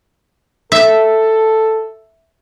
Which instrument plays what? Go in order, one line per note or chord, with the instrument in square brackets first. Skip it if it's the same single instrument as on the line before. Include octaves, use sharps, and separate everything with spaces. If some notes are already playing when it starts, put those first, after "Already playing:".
[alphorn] A4 [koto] E5